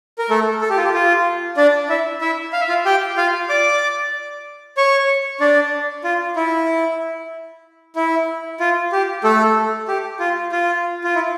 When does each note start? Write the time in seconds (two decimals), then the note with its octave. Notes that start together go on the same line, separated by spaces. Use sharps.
0.18 A#4
0.30 A3 A4
0.61 A4
0.70 G4
0.77 F4
0.84 G4
0.94 F4
1.57 D4 D5
1.89 E4 E5
2.21 E4 E5
2.53 F5
2.61 E5
2.69 F4 F5
2.85 G4 G5
3.17 F4 F5
3.49 D5 D6
4.77 C#5 C#6
5.40 D4 D5
6.04 F4
6.36 E4
7.96 E4
8.60 F4
8.92 G4
9.24 A3 A4
9.88 G4
10.20 F4
10.52 F4
11.04 F4
11.15 E4